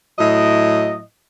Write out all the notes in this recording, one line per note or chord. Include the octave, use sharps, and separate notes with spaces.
A2 F#3 E4 D#5